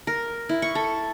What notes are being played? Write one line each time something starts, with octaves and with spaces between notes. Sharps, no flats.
A#4
E4
C#6
A4